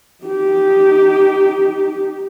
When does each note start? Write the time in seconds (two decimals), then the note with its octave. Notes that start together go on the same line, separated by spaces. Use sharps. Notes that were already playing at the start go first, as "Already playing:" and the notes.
0.25 D#4 G4